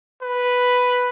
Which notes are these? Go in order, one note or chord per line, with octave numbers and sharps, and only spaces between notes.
B4